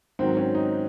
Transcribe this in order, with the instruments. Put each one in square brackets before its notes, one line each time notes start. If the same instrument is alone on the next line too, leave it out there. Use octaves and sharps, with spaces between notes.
[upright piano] G#2 D#3 F#3 C4
C#4
D#4